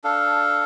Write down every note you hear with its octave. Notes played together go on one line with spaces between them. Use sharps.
D4 A4 F5